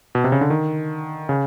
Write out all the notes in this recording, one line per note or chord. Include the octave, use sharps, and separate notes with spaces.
B2
C3
C#3
D3
D#3
C#3